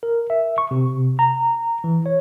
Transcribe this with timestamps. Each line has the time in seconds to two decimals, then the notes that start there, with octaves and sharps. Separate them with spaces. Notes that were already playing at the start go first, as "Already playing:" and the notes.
0.03 A#4
0.30 E5
0.58 C#6
0.71 C3
1.19 A#5
1.84 E3
2.06 C#5